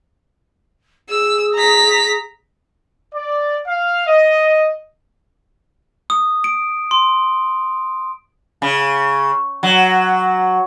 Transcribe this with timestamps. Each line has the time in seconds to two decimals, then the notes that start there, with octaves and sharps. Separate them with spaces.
1.10 G#4 E6
1.55 A#5 B6
3.14 D5
3.67 F5
4.07 D#5
6.10 D#6
6.44 D7
6.91 C6
8.62 C#3
9.63 F#3